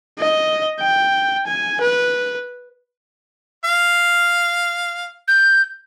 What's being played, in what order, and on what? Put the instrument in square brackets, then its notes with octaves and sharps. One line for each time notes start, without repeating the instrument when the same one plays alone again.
[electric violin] D#5
G5
G#5
B4
[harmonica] F5
[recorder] G6